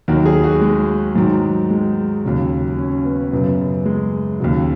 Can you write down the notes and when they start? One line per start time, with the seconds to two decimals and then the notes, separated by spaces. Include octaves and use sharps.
0.08 D#2 D#3 F#3 F#4
0.26 G#4
0.44 F#4
0.61 G#3
1.15 G#2 D#3 F#3
1.70 G#3
2.24 D#2 C#3 F#3
2.78 C#4
3.04 B3
3.32 F#2 C#3 F#3 B3
3.86 G#3
4.40 D#2 C#3 F#3